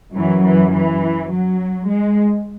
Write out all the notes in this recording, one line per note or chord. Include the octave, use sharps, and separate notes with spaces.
F#2 E3 F#3
E3
E3
F#3
G#3